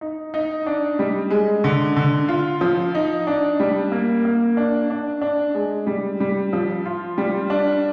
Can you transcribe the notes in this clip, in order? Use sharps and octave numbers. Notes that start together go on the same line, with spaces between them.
D#4
D#4
D4
G3
G#3
D3
D3
F4
F3
D#4
D4
G3
A#3
A#3
D4
D4
D4
G#3
G3
G3
F3
F4
G3
D4